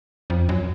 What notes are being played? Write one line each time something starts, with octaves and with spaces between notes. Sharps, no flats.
F2
F#2